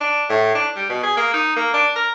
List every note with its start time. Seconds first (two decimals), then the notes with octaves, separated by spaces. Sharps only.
0.01 D4
0.30 A2
0.55 D4
0.76 G3
0.89 B2
1.03 G#4
1.17 A#3
1.34 D#4
1.56 A#3
1.74 D4
1.96 A#4